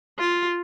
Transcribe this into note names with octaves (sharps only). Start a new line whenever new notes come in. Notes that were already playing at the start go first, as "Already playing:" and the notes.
F4